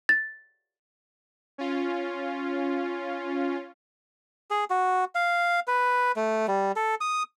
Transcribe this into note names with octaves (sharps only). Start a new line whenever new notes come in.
A6
C#4 F4
G#4
F#4
F5
B4
A3
G3
A4
D#6